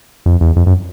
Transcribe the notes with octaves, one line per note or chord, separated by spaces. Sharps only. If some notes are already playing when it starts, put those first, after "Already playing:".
F2
E2
F2
F#2